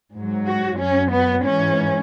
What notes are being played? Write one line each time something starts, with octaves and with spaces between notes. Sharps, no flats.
G#2 F#3
F#4
F#2 F#3 C#4
B3
G#2 E3 C#4